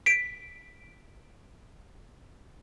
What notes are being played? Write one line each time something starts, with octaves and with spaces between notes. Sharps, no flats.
B6 D7